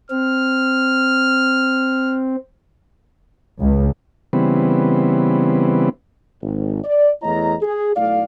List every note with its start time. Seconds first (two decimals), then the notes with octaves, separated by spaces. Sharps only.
0.11 C4 F6
3.60 C#2
4.33 C#3 E3 G3 B3 C4
6.42 G#1
6.84 D5
7.22 E2 A3 E4 C#5 D#5 A#5
7.62 G#4
7.96 B1 A3 E4 D5 F5